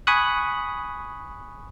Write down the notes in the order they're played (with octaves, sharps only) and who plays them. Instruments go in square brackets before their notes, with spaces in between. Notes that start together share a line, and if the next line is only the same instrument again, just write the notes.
[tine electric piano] G#5 B5 C#6 D#6 F#6